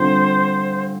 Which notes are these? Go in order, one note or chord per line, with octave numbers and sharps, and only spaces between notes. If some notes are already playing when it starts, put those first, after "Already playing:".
Already playing: D3 G3 C4 F4 C5